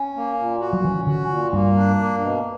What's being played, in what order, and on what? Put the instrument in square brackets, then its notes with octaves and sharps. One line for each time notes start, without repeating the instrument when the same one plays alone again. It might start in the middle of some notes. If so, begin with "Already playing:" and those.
Already playing: [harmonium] C#4
A#3
A#2
F#4
[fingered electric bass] F#3
[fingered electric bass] E3 [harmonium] C#4
[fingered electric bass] D3 [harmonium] F#4
[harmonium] A#2
[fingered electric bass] G2 [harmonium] A#3
[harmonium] D4
A#3
B2